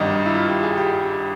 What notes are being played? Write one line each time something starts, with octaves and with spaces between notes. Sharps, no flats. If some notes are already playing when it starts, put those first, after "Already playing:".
Already playing: G#1 G2 D#3 D#4
E4
F4
G4
G#4
G4